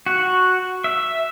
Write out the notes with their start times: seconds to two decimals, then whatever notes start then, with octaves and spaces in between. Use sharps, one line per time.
0.06 F#4
0.84 E5